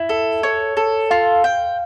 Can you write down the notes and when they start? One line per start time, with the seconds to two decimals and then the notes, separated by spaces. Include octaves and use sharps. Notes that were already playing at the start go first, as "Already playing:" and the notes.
Already playing: E4
0.09 A4
0.43 C#5
0.77 A4
1.11 F4 F5
1.44 G5